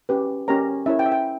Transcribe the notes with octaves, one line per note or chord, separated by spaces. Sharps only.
C#4 G4 B4
C#4 G4 A#4 C#5 A#5
C#4 E4 A#4 C#5 E5
G5
E5
G5